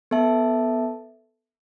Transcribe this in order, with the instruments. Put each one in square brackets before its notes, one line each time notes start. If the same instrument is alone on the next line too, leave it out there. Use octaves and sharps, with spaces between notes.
[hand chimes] B3 A4 E5 A5